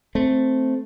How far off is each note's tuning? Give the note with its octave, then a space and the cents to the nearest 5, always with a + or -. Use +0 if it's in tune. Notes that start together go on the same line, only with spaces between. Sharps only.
A3 +0 C4 +0